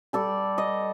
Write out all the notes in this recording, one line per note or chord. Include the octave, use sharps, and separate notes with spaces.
G3 A4 D5
D#5